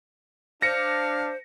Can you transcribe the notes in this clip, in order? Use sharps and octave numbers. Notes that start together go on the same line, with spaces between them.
D4 C5 F5 A#6 C#7